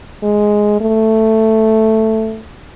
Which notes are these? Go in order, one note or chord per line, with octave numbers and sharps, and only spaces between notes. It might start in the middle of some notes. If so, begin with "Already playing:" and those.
G#3
A3